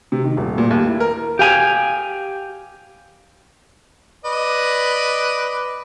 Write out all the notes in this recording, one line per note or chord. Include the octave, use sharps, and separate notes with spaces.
C3
D#3
D#1
A#2
D#2
E4
A#4
G4 F5 G#5
B4 D5 D#5